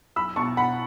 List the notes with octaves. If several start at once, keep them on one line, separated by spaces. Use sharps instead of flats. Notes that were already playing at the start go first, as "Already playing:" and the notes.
B1 B5 E6
B2 A5 C#6
B2 F#5 B5